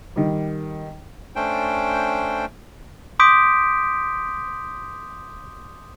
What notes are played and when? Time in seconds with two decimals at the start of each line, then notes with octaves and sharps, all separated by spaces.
0.16 D#3 G3
1.36 A3 C#4 D4 C5 G5
3.19 C6 D6 D#6 G6 B6 D7